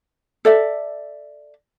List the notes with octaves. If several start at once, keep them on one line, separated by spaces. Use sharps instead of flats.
A4 D5 E5